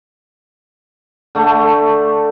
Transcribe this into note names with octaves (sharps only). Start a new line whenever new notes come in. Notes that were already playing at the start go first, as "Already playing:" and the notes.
D3 A3